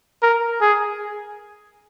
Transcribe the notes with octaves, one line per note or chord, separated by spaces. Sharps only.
A#4
G#4